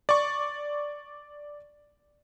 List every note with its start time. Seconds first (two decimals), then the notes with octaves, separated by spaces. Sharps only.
0.09 D5 C#6